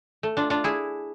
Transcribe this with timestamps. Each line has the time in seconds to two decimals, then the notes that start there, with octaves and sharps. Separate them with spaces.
0.23 A3
0.37 D4 F4
0.50 D4 F4
0.64 E4 G#4